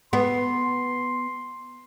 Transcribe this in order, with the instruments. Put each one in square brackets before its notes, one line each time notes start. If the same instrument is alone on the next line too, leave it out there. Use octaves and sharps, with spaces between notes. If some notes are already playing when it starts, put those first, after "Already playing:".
[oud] B3 [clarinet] C6